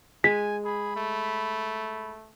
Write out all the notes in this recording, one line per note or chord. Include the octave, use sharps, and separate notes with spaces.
G#3 G#5 B6
G#4 B5
A3